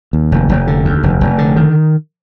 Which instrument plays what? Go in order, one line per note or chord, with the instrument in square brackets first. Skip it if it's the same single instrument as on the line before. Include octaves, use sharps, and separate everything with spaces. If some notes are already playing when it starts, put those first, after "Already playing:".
[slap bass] D#2
F1
F1
D3
D#2
F1
F1
D3
D#3